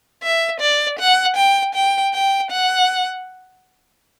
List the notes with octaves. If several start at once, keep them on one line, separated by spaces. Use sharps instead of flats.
E5
D5
F#5
G5
G5
G5
F#5